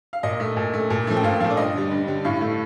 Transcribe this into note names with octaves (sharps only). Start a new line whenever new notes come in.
F5
A#2 D#5
A3
A#2
A3
A#2
F3 A3
G5
A#2 F5
F3 A3 F5
D5
G2 D#5
D3 G3
G2
D3 G3
A2 F5
A3